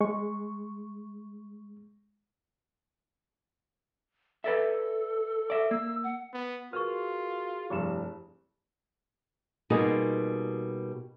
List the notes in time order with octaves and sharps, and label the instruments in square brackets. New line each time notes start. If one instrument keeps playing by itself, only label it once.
[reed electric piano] G#3 C#6
[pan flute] A4 [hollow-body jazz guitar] B4 D5 E5
[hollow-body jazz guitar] D5 E5
[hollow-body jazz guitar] A#3 [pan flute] E6
[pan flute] F#5
[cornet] B3
[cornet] F4 [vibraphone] F#4 G#4 [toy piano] A#4 B4 C#6 [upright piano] F6
[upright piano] F1 G2 E7 [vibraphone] E4 [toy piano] G4 G#4
[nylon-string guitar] B2 G3 A#3 D#4 F4 G#4